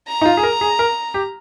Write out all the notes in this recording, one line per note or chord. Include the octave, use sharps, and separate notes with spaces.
A#5
D#4
F4
G#4
A#4
G#4
A#4
G4